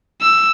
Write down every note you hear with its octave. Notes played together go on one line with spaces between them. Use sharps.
E6